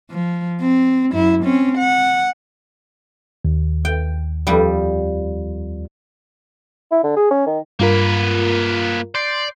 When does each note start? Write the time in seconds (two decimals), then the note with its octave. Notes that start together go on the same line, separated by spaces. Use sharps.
0.11 F3
0.61 C4
1.12 F#2 E4
1.44 C4 C#4
1.78 F#5
3.45 D#2
3.85 G5
4.47 F2 G3
6.92 E4
7.04 D3
7.16 G#4
7.31 C#4
7.47 D#3
7.80 G2 A#3 F4 A#4 B4
9.15 D5 C6 G6 C7